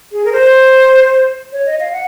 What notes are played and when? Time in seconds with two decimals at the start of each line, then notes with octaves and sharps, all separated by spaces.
0.12 G#4
0.25 A#4
0.32 C5
1.52 C#5
1.66 D#5
1.80 F5
1.93 F#5